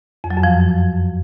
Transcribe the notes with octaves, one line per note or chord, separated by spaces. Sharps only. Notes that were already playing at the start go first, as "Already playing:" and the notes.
F2
F#3
F#2
F3